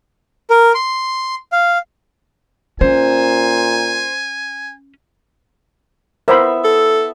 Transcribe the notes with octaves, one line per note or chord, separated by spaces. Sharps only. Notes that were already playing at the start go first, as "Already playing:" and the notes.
A#4
C6
F5
A#2 C#4 C5 G#5
B3 E4 A#4 C5 E5 B5
A4